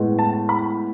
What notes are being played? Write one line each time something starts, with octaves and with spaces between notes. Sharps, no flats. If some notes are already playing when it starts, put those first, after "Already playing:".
Already playing: A2 G#3 B3
A5
B5